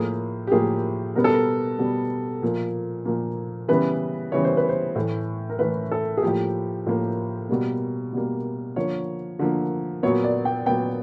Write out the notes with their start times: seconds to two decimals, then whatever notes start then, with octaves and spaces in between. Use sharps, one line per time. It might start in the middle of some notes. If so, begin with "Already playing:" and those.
Already playing: A2 F3 A#3 G#4
0.47 G4
0.52 A2 F3 A#3 G#4
1.15 B2 G3 B3 A#4
1.24 A4
1.34 A#4
1.79 B2 G3 B3
2.42 A#2 F3 A#3
3.05 A#2 F3 A#3
3.68 C#3 E3 G3 B3 B4
4.32 C#3 E3 G3 B3 C#5
4.44 C5
4.57 B4
4.69 C5
4.95 A2 E3 A3
5.50 A#4
5.59 A2 E3 A3 B4
5.91 A4
6.17 G#4
6.23 A2 F3 A#3 G4
6.86 A2 F3 A#3
7.49 B2 G3 A#3
8.13 B2 G3 A#3
8.76 D3 F3 A#3 C#5
9.39 D3 F3 A#3
10.03 A#2 F#3 B3 C#5
10.24 D5
10.45 G5
10.66 A#2 F#3 B3 G5